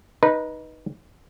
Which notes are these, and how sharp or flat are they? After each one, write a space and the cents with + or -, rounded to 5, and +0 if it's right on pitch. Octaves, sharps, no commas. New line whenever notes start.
D#4 +0 B4 -15